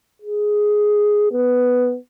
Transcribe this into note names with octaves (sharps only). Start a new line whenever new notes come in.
G#4
B3